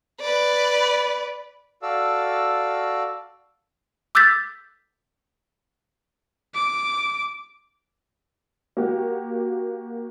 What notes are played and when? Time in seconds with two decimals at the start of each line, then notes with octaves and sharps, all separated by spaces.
0.20 B4 D5
1.82 F#4 A4 D5 F5 E6
4.15 D6 E6 F#6 G6 A6 B6
6.55 D6
8.77 A#3 F#4 G4